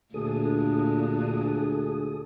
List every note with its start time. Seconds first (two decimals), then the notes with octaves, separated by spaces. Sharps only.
0.14 D2 A#2 D4 G#4 A4 D#6